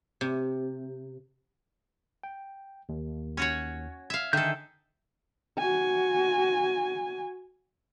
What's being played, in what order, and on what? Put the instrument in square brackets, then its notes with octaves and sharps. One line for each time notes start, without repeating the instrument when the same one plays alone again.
[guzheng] C3
[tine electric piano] G5
D#2
[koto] C#4 F#4 C#5
[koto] E5 F5 [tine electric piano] G#6
[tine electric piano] D3 [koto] D#3 A4 [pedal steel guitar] G#4 E5 G6
[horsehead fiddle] F#4 G#5